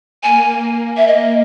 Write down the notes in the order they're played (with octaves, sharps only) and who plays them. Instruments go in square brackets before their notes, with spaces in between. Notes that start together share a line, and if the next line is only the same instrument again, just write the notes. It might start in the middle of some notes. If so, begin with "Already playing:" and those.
[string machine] A#3 [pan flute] G#5
[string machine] A#3
[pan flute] E5
D#5